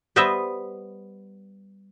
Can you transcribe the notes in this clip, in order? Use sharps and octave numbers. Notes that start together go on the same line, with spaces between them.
G3 B3 B4 C5 D#5 E5